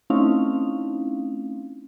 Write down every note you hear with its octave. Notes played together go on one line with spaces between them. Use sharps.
A3 C4 C#4 D#4 E4 F5